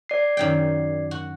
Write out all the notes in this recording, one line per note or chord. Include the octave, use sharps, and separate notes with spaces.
D5 C7
F#2 D#3 G5
F#4